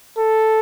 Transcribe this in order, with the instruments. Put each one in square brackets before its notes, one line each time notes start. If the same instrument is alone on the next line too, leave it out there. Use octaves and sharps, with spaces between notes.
[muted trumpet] A4